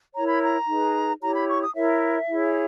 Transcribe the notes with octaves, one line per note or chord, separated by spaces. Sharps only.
E4 A#4 C#5 A#5
B5
A#5
D#4 G#4 B4
E4 G4 C#5 A#5
B5
C#6
D#6
E4 A#4 C#5 E5
E4 G#4 C#5